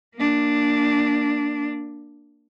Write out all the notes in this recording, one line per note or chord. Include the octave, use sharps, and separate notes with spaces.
A#3 D4